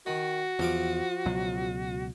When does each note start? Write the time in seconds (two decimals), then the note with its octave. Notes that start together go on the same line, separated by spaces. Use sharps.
0.06 D#3 F#4
0.59 E2 F3 F5 D6
1.26 C#2 B2 F#3